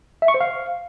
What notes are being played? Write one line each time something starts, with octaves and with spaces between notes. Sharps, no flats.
E5
C#6
C5
F5